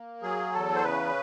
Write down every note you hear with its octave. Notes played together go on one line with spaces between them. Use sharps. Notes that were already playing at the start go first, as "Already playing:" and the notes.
Already playing: A#3
F#3 G#4
E2 A4
C5
C#3 B4